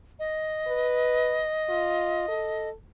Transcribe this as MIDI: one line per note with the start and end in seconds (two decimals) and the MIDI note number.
0.19 2.69 75
0.67 1.44 71
1.69 2.26 65
2.28 2.73 69